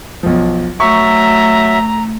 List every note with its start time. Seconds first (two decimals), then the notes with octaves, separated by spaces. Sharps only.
0.23 B1 F3
0.80 F#3 A3 E5 A#5 C#6